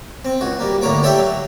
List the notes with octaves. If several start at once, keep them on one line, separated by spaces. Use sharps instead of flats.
C4
C#2 F#4
G3 A#3
D2 A2 D3 A#3 C#5 D6
G4 A4 C#5 D5 E5 G5
F#3